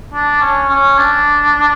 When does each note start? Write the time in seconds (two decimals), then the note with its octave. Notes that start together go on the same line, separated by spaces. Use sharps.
0.14 D4
0.41 C#4
0.70 C#4
0.98 D4